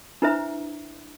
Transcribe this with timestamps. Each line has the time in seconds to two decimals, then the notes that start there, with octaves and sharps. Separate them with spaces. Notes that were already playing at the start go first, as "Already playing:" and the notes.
0.22 D4 E4 B4 C5 E5 A#5